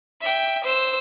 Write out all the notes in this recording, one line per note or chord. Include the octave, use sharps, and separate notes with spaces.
E5 G5
C5 E6